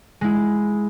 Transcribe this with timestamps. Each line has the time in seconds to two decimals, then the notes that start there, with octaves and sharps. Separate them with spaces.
0.21 G#3 E4